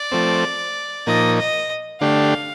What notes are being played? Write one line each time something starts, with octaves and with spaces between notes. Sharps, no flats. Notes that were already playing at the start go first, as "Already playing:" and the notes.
Already playing: D5
F3 A3 C4
A#2 F3 A#3 D#4 D#5
D#5
D3 A3 D4 G4 F5